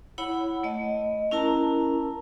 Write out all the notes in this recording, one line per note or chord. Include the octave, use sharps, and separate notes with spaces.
E4 C#5 F#5 B5
A3 D#5
C#4 E4 A#4 A5 A#5